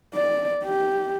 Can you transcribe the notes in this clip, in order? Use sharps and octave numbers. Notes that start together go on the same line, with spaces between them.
D5
G4